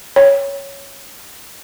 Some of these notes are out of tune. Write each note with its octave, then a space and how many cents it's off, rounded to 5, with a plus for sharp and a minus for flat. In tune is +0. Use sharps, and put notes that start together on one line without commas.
C#5 +0